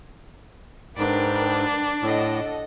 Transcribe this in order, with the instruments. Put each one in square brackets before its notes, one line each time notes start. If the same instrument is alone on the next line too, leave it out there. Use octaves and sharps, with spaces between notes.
[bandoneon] G#2 [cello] D4 [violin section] A#4 B4 G5
[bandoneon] A2 [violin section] A4 D#5 F#5